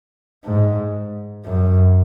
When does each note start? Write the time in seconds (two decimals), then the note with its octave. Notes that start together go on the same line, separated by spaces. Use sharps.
0.45 G#2
1.45 F#2